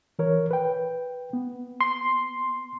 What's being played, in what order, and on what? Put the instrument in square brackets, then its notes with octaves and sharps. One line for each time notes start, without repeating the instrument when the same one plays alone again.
[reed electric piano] E3 A#4 C#5
B4 G5
B3
[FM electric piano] C6